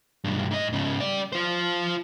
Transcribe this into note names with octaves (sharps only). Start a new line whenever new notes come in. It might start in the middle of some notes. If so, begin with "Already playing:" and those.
B1 G2
G#2 D#5
G#2 C#3
G3 D5
F4 C5